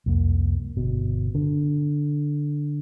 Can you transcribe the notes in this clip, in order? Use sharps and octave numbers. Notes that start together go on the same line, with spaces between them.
C2 F2 A#3
G1 B2
D3